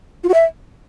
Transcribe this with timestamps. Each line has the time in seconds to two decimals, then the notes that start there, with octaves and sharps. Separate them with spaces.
0.24 F4
0.29 F#4
0.34 E5